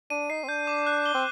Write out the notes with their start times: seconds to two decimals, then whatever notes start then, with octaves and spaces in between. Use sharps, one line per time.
0.10 D4 D#7
0.29 D#4 C7
0.43 C4
0.48 D4 G6
0.67 D6
0.87 F#6
1.06 G7
1.14 C4